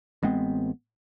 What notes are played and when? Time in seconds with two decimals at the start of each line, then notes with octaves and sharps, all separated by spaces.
0.23 A1 G#3 B3 C4